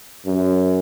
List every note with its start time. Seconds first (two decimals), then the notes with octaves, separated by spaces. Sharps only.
0.26 F#2